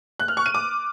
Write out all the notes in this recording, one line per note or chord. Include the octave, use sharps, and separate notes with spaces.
F#6
F6
C#6
D#7
D6